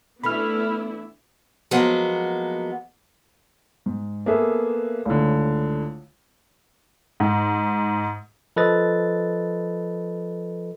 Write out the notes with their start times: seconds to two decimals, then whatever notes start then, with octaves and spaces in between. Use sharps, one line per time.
0.23 E3 A3 B3 C#4 D4 E4 B5 F6
1.71 F3 F#3 G#3 A#3 B3
3.86 G#2
4.26 A#3 B3 G#4 A4 B4 E5
5.06 C#2 A2 D3
7.20 G#2
8.56 F3 A4 B4 D#5 A6